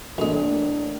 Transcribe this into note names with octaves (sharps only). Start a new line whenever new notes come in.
B1 A2 G#3 A#3 D4 F7